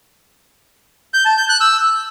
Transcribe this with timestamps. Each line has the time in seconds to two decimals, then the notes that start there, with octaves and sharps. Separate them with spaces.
1.14 G6
1.26 A5
1.37 G6
1.49 F#6
1.61 E6